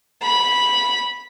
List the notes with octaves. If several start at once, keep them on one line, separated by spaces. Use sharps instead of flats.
B5